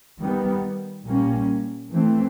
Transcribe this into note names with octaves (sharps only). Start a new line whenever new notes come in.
D#3 G3 B3
A#2 G3 A#3 C#4
E3 A3 C4